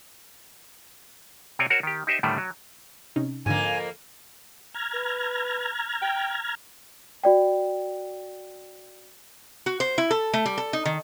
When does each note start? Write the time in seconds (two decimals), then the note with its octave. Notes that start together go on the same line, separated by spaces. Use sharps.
1.59 C3 C4 C#5 D5 G#5
1.70 F#4 A#4 C5 C#5 F#5
1.83 D#3 G4
2.07 D#4 G4 C5 D#5 E5
2.23 A2 D3 D#3 G3 A3
2.38 F#3
3.16 C3 C#4 D#4
3.46 F2 G#2 D3 A#3 G#5
4.74 A#5 F6 G#6
4.94 B4
6.02 G5
7.23 F#4 D5 G5
9.66 F#4
9.80 C5
9.98 E4
10.11 A4
10.34 A3
10.46 G3
10.57 A4
10.73 D#4
10.85 D#3